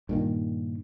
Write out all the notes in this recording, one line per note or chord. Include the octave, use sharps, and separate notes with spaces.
G2 A#2 D#3